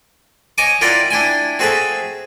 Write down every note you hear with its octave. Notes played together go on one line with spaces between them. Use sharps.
C#5 D#5 G#5 C#6 D6
E4 F4 A#4 D5 F#5 G5
D4 E4 G5 G#5
C4 F#4 G#4 A4 E5